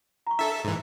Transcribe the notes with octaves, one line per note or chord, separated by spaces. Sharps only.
A#5 C#6
D4 A4 E5
G#2 E3